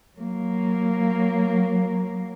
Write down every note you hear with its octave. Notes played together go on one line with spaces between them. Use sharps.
F#3 A#3